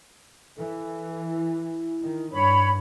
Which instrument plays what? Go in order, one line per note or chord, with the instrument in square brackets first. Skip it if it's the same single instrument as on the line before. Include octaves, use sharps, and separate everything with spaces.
[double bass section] E3 [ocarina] A4
[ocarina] E4
[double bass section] D#3
[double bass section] G2 [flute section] C#5 B5